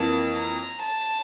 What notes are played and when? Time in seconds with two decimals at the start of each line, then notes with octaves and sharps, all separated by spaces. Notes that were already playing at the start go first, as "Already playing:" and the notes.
Already playing: F2 E3 A#3 A5
0.37 A#5
0.83 A5